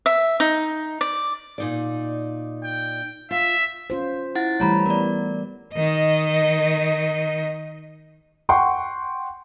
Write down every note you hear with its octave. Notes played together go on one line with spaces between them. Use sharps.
E5
D#4
D5
A#2 D#4 D5
G5
F4 E5
C#4 F4 C5
E4 F#5 A6
E3 G3 A3 C#5 A#5 B5
E3 B3 A#4 D5
D#3 D#5
F#5 G5 C6 C#6